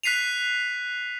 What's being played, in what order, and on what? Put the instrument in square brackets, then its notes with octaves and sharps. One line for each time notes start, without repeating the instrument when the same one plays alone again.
[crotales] F#6 B6 C7 D#7 F7